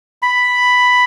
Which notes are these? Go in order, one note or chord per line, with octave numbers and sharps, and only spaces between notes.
B5